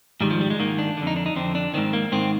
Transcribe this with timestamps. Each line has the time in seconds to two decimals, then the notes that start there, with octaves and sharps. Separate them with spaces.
0.21 G#2 D#3 G3
0.31 F3
0.41 G3
0.50 G#3
0.59 G#2 D#3 A#3
0.79 D4
0.97 D3
1.02 F2 D#4
1.16 D4
1.26 D#4
1.36 F2 D3 C4
1.55 D4
1.74 G#2 D#3 C4
1.93 A#3
2.12 G#2 D#3 C4